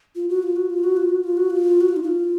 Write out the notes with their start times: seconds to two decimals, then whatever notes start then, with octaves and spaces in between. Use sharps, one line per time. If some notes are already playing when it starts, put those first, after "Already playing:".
0.16 F4
0.29 F#4
0.43 F4
0.56 F#4
0.70 F4
0.84 F#4
0.97 F4
1.10 F#4
1.24 F4
1.37 F#4
1.50 F4
1.81 F#4
1.89 F4
1.96 D#4
2.03 F4